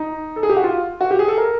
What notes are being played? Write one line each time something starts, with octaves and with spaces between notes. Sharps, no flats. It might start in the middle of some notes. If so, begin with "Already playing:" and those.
Already playing: D#4
A4
G#4
G4
F#4
F4
F#4
G4
G#4
A4
A#4